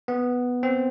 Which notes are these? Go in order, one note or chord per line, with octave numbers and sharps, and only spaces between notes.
B3
C4